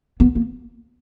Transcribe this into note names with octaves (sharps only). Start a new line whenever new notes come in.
B3
A#3